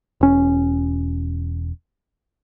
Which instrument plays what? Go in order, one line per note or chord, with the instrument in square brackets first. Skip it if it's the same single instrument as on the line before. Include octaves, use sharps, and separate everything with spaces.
[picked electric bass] E1 C#4